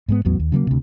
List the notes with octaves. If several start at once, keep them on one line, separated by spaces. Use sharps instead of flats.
G#2 G#3 B3
A1 E2 F#3 B3
D#2
C#3 F#3 G#3 A#3
D2 C3